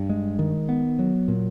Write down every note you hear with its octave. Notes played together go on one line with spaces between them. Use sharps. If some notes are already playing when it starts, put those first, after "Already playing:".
Already playing: G2
G#3
D#3
B3
F#3
A#2